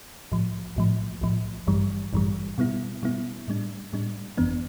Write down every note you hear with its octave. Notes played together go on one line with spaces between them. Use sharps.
B1 A2 F3
B1 A2 F3
B1 A2 F3
A1 G2 E3 G3
A1 G2 E3 G3
B2 G3 B3 E4
B2 G3 B3 E4
A2 G3 D4
A2 G3 D4
G1 F2 E3 B3 D4